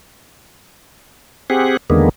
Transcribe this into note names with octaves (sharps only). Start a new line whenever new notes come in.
C4 G4 G#4 F#5
E2 D3 D#3 G#3 A#3 B3